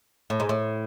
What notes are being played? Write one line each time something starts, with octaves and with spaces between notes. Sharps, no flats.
A2
G#2
A2